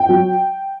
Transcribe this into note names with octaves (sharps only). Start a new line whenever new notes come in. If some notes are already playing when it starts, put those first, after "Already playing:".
Already playing: G5
F#3